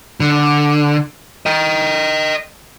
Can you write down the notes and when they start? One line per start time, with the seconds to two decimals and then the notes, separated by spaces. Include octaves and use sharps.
0.20 D3
1.46 D#5 G5